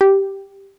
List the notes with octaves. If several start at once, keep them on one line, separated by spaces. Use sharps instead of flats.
G4